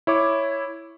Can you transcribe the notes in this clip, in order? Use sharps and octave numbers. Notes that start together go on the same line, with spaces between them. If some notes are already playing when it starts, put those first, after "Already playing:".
E4 C#5 D6